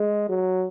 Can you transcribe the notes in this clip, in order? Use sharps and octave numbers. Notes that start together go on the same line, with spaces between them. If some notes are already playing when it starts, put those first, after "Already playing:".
Already playing: G#3
F#3